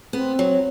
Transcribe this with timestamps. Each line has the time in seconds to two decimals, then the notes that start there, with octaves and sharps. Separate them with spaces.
0.13 B3 C4
0.39 F#3